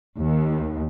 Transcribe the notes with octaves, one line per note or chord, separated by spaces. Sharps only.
D#2